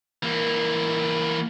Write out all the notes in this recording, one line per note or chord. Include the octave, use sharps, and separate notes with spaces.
E3 A#3